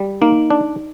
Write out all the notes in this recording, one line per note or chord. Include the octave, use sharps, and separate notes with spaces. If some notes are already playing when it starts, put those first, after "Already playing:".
Already playing: G3
A#3 D#4
D4